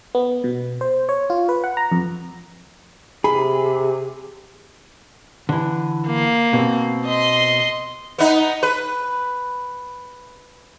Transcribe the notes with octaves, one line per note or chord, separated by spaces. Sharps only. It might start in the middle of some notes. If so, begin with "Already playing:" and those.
B3
B2
C5
C#5
F4
B4
F#5
A#5
F2
C3 G#4 B5
D3 E3
A#3
B2 C4
D#5 C6
B3 D#4
B4